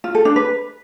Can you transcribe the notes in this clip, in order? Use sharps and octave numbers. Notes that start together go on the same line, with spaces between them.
F4
A4
D4
B4